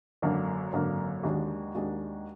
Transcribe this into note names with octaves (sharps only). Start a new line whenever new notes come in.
G#1 F#2 D3 F#3 A#3
G#1 F#2 D3 F#3 A#3
D#2 D#3 G#3 D4 F#4
D#2 D#3 G#3 D4 F#4